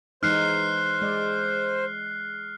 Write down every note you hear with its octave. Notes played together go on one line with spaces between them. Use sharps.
E3 G#3 D#4 C5 F6 F#6 C7
G#3 D5